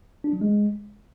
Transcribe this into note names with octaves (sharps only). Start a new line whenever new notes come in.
D4
F#3
G#3